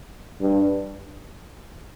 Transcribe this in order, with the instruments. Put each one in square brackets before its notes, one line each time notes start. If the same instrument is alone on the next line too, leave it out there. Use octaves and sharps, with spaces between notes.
[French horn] G2